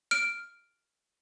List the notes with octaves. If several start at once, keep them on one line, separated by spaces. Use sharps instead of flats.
F6 D7